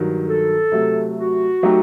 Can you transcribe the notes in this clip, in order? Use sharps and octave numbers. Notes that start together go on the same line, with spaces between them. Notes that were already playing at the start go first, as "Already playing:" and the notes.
Already playing: G2 D#3 F#3
A4
C3 F#3 A3
F#4
F#3 A3 D#4 G4